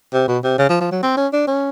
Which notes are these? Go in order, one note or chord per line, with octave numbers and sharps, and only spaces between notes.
C3
B2
C3
C#3
F3
F3
F#3
C4
C#4
D4
C#4